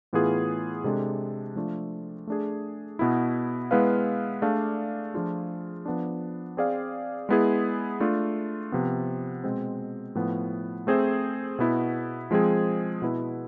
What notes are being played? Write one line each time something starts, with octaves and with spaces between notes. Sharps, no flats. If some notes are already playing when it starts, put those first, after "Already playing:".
A2 E3 B3 F4 G#4
C3 G#3 D4 A4
F3 A3 D4 F4
A3 D4 G#4
B2 B3 E4
G#3 B3 E4 B4 F5
A3 D4 G#4 D5 F5
F3 A3 D4 F4 G#4
F3 B3 D4
C4 G#4 D5 F5
G#3 B3 E4 G#4
A3 D4 F4
C3 F3 B3
B2 G#3 C4
A2 F3 B3
A3 C4 G#4 C5 E5
B2 B3 E4
F3 G#3 C4 G#4
B2 B3 E4 B4